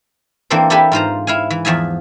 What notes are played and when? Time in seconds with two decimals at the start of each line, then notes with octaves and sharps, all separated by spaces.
0.50 E3 A#3 C4 D4 A4 C5
0.70 G4 A4 B4 E5 G#5 B5
0.92 G#2 F4 C5 A#5
1.27 E4 F5 G#5
1.50 E3
1.65 E2 F3 E5 G#5